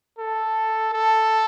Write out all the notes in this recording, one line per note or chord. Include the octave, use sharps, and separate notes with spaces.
A4
A4